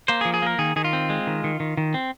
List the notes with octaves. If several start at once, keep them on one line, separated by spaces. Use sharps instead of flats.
A#3 C5
G#4
F3
G#4
A#3 A#4
D#3 G#4
D#3 G#4
F4
C4
G#3
D#3
D#3
D#3
D#3
C4